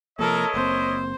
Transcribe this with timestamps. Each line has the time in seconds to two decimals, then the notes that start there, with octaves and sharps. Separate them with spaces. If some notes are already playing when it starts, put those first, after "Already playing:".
0.19 C3 F3 A#3 E4 A4 A#4 C#5 D#5
0.54 F#1 A#3 C4 C5